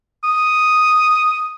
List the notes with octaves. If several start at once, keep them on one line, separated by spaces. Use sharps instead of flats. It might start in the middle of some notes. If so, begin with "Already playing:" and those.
D#6